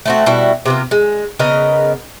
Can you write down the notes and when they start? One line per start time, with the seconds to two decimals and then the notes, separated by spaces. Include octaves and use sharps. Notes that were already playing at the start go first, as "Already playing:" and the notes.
0.06 A3 C4 F#4
0.26 B2 G3 E4 F#4
0.66 C3 B3 F4
0.91 G#3
1.39 C#3 B3 A#4 D#5